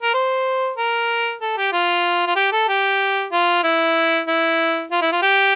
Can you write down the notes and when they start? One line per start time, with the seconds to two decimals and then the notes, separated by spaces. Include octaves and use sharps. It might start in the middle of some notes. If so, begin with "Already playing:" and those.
0.02 A#4
0.14 C5
0.78 A#4
1.41 A4
1.57 G4
1.73 F4
2.27 F4
2.36 G4
2.52 A4
2.69 G4
3.32 F4
3.63 E4
4.28 E4
4.91 F4
5.01 E4
5.12 F4
5.22 G4